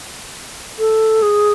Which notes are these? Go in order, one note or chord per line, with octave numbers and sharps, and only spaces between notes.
A4
G#4